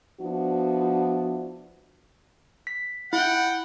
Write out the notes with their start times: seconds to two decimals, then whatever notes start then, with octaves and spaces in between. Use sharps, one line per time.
0.21 F3 B3 D4 E4 F#4
2.67 B6
3.13 E4 F#5 G5